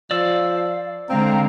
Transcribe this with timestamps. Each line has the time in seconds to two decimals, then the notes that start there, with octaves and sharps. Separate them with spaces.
0.11 F3 D5 F5 E6
1.09 D3 G#3 C4 F5 G5 A#5